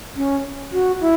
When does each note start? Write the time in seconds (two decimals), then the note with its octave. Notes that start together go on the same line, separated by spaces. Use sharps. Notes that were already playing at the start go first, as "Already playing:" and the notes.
0.16 C#4
0.72 F#4
1.01 E4